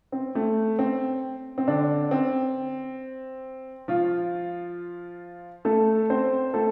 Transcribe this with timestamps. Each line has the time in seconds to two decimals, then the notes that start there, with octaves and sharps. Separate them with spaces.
0.12 C4
0.35 A3
0.79 C4
1.58 C4
1.68 D3 D4
2.11 C4
3.88 F3 F4
5.65 A3 A4
6.10 C4 C5
6.54 A3 A4